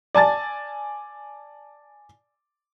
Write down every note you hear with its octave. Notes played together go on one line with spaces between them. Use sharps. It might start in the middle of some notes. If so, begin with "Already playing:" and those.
D5 G#5 A5 A6